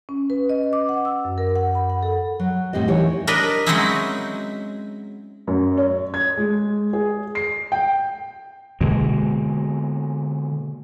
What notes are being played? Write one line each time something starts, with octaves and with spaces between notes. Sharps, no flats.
C#4
B4
D#5
D6
F#5
E6
F#2
A#4
F#5
B5
F#5
A4
F#3
D2 A2 G3 C4 G4 D#5
D#2 E3 G4 C#5
D4 A#4 B4 D5 D#5
F#3 G#3 C4 C#4 D#4 E4
F#2
C#5
G#6
G#3
G#4
C7
G5
B2 D3 G#3 A#3